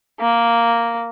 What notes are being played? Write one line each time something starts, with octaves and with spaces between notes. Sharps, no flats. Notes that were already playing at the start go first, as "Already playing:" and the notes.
A#3